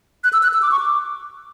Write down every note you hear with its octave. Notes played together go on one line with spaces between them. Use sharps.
F#6
E6
F#6
E6
D6
C#6
D6